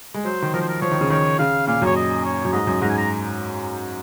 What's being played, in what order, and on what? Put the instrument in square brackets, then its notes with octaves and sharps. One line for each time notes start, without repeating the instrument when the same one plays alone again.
[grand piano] G#3
[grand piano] F#3 [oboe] C5
[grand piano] D#3
[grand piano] F3 [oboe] A#4
[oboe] C5
A#4
[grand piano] F3 [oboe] C#5
[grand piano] D#3
C#3
[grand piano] D#3 [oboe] C#5
[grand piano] C#3 [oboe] F5
[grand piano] A#2 [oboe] F5
[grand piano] F#2 [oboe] C#5
[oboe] D#5
C#5
[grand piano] F#2
[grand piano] G#2 [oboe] D#5
[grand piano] F#2
[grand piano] G#2 [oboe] A#5
[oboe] G#5
A#5